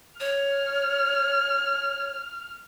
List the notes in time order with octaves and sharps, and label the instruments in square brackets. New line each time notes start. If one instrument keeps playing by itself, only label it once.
[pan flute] C#5 [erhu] F6